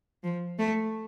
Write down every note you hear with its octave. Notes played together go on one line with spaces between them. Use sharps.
F3
A3